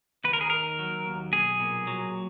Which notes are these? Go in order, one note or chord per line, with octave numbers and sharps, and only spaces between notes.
D#2 B4
A#4
G#4
D#3 A#4
F#3
D#2
B1 G#4
A#2
F#3